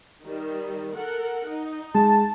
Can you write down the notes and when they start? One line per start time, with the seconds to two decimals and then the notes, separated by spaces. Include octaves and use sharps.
0.24 D#3 G3
0.95 A4 A#4 F#5
1.47 D#4
1.94 G#3 A5